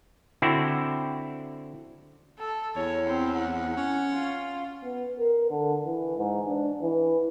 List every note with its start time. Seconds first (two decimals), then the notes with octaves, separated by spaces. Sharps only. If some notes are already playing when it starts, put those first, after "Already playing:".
0.42 D3 C4 E4 F#4
2.39 A4
2.76 E2 C#5
3.08 C4
3.37 F#5
3.77 C#4
4.14 F4
4.83 B3
5.19 A#4
5.51 D3
5.85 E3
6.17 G#2
6.48 D4
6.82 E3